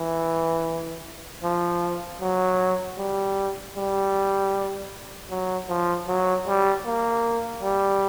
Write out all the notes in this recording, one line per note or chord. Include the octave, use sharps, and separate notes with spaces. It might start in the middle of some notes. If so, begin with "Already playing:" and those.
Already playing: E3
F3
F#3
G3
G3
F#3
F3
F#3
G3
A#3
G3